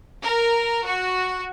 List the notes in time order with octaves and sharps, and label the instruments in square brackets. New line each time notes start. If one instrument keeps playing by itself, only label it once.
[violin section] A#4
F#4